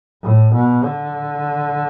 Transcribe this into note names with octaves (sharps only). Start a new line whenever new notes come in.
A2
B2
D3